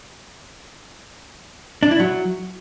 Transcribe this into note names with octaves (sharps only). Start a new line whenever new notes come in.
D4
E4
F#3